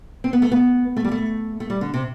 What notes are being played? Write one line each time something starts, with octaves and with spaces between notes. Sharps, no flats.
C4
B3
A3
B3
A3
G3
A3
A3
G3
D3
C3